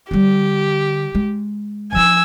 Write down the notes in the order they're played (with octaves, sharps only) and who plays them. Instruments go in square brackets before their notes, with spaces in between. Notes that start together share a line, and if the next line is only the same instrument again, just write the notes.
[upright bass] D3 G3 [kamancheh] G4
[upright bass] G#3
[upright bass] F3 D4 [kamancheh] G#5 E6